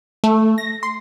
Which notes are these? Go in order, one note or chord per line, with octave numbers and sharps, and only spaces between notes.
A3
A#6
C6